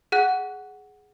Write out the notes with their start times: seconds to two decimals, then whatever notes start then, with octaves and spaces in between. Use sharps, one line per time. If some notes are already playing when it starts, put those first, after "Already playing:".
0.12 G#4 F#5 F#6